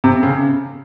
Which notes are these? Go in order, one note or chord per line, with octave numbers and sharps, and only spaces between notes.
C3
C#3